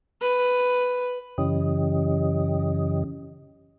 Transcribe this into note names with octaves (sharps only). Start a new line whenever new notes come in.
B4
F#2 C#3 E3 C#4 G4 D#5